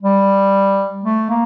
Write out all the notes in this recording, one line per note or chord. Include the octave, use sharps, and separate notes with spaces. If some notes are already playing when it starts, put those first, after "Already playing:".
G3
A3
A#3